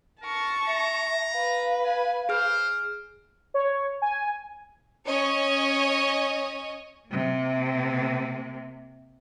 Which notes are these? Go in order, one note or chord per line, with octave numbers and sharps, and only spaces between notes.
A#4 A5 C#6
E5 A#5
B4 F5
G#5
G#4 C5 F6
C#5
G#5
C#4 C#5 D#5
C3 A#3